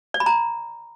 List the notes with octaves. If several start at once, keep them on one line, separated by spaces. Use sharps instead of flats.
D5
B5
A#5